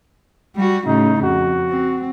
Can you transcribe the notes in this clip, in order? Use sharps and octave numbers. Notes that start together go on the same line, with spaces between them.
G3 F#4
A2 C#3 D#4
F2 F#4
C4